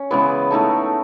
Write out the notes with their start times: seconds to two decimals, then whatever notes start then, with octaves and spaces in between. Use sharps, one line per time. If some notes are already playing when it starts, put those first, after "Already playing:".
Already playing: C#4
0.11 C#3 E3 G#3 B3
0.51 E3 A3 D#4 A4